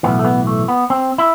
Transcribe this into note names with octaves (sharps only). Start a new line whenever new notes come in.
B1 A2 E3 B3
A3
B3
A3
B3
C4
E4